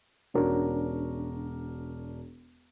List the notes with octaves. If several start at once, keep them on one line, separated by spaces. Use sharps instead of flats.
E1 C#4 D4 F#4 A#4